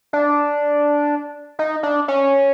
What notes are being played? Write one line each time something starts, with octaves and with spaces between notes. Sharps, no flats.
D4
D#4
D4
C#4